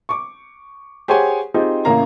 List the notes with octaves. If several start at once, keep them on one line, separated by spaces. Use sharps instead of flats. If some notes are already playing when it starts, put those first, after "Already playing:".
C#6 D6
G4 G#4 C5 C#5 F#5 G#5
C4 D#4 F4 G4 G#4
A1 C#3 A#3 E4 F5 A#5